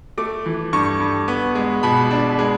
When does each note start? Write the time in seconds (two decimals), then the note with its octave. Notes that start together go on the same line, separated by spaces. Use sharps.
0.18 A3 D6
0.46 E3
0.73 G2 C#6
1.00 G2
1.28 B3
1.55 G#3
1.83 B2 B5
2.11 D4
2.39 G#3